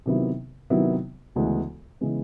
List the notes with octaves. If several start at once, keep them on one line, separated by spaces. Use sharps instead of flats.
C3 D#3 F#3 B3 E4
C3 D#3 F#3 B3 E4
D2 C#3 E3 G#3 B3
C#3 E3 G#3 B3